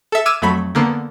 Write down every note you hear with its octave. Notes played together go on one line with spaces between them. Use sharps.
A4 E5
D6 E6 F6 G#6 D#7 E7
F2 F#3 A3 B5 B6
D3 A#3 B3